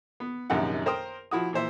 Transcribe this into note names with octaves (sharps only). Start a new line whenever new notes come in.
B3
A#1 F#2 C3 D#3 F#5
A#4 C5 G5 C6 D#6
F3 E4 F#4 D#6
A#2 E3 C5 E5